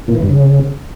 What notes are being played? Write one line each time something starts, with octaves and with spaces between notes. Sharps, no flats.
A#2
E3
G2
C#3